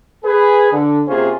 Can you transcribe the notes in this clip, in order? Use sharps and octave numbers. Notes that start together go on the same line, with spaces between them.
G#4 B4
D3
C3 A#3 C#4 F4 G#4 C5